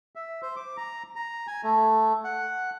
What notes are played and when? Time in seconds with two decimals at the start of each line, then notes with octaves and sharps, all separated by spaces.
0.15 E5
0.42 C5
0.56 D6
0.77 A#5
1.16 A#5
1.47 G#5
1.63 A3
2.24 F#5